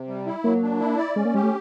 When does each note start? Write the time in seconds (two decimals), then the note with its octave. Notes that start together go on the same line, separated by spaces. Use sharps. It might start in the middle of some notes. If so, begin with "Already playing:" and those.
Already playing: C3
0.08 G3
0.27 E4
0.44 F#3 A#3
0.63 D4
0.80 E4
0.98 D5
1.16 G#3 C#4
1.25 A#3
1.34 G#3 G4
1.43 A3